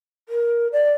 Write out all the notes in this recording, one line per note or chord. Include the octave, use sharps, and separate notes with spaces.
A#4
D5